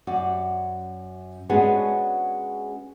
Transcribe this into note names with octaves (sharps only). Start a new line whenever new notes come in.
F#2 F#4 D5
G#3 B3 C#4 D4 F#4 G#4